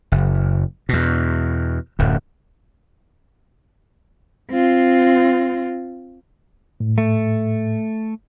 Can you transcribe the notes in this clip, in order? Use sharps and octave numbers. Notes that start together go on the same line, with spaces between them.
F#1
E2 B2
D1 F#2
C4 F4
A2
A3